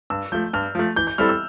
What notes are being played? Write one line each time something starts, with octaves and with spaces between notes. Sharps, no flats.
G2 E6
F3 A3 G6
G2 F6
F3 A3
E3 G6
G6
G3 C4 E4 A4 F6
E6